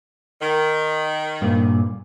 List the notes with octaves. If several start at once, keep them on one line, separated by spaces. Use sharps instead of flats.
D#3
G2 A#2